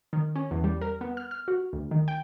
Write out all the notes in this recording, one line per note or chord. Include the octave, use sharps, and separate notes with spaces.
D#3
C#4
E2
G3
A#4
B3
F6
F6
F#4
D2
D#3
G5